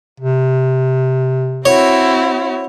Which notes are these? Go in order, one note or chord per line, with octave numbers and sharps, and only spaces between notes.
C3
C4 E4 F#4 C#5